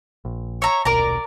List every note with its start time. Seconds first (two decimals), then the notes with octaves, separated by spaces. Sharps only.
0.25 A#1
0.62 C#5 E5 A#5
0.85 D#1 B1 A#4 D5 A#5